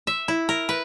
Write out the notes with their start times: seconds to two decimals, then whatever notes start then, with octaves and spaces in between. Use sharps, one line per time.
0.07 E5
0.28 E4
0.49 A#4
0.69 B4